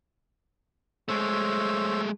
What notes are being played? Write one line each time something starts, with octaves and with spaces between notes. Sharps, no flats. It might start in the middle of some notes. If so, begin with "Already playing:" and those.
G#3 A3 C5 C#5 E6